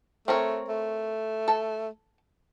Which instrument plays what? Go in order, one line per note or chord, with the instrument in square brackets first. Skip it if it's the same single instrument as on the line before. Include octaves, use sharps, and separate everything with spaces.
[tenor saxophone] A3 [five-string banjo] C4 A#4 C#5
[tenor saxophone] A3
[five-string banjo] A4 A5